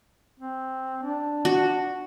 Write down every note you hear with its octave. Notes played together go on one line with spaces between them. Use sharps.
C4
D4
F#4